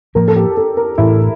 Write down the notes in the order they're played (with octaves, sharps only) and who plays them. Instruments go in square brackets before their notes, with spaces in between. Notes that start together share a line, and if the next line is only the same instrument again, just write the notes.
[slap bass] A2 F3 A#3 [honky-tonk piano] A#4
[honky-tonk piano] A4
G4
A4
A#4
[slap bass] A2 E3 A3 [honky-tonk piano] E4